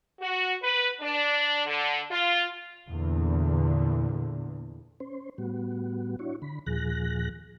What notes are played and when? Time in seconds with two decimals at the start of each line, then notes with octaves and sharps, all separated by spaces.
0.20 F#4
0.63 B4
1.01 D4
1.67 D3
2.11 F4
2.87 E2 A#2 D3
5.00 C#4 C5
5.38 A2 G3 B3 F#4
6.19 D4 E4 F#4 C#5
6.42 D3 B5
6.66 D#2 A#2 F3 G#4 F#6 A#6